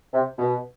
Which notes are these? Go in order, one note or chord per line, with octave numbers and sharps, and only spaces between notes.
C3
B2